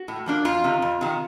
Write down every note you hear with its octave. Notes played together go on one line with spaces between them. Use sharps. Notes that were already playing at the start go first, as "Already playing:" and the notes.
Already playing: F#4
A2
F3 A#3 D4
F2 F4
C3 D#3
F2
C3 D#3